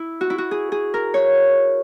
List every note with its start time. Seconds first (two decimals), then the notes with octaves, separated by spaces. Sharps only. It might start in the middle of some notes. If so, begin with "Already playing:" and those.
Already playing: E4
0.21 F#4
0.30 E4
0.38 F#4
0.51 G#4
0.72 G#4
0.94 A#4
1.14 C#5